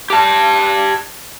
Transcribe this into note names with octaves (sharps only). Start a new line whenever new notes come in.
G4 A5